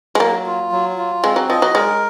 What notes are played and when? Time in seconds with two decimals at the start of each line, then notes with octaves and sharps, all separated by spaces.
0.15 G#3
0.20 F#3 A#3
0.46 F4
0.72 F#3
0.98 F4
1.24 G#3 C4
1.36 F#3
1.49 F3 D#5
1.62 F#3
1.75 G#3 A#4